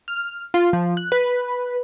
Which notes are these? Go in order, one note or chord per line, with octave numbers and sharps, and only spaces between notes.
F6
F4
F3
F#6
B4